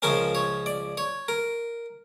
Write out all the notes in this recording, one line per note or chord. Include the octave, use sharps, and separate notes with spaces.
C#2 C#3 F3 C#4 A#4
C#5
D5
C#5
A#4